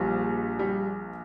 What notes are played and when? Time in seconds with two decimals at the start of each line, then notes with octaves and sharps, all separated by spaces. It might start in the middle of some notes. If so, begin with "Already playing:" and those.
Already playing: A#1 A#2 F3 G3
0.59 G3